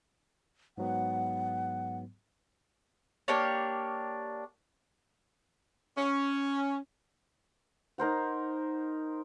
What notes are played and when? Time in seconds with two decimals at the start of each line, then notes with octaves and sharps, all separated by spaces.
0.78 G#2 F#3 B3 F#5
3.28 A#3 D4 G4 C#5
5.97 C#4
7.98 D#4 A#4 C5 F#5